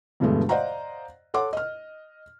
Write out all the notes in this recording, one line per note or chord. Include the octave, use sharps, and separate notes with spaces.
E2 G2 B2 D3 G#3 A3
C5 D5 D#5 F5 F#5 A#5
A4 C#5 F#5 C6 D6
D#5 F6